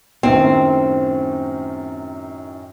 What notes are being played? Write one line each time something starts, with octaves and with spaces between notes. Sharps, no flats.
F#2 A2 D#3 C4